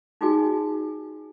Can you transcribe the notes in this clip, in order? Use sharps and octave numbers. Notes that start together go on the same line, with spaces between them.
D#4 F4 F#4 G#4 D5 G#5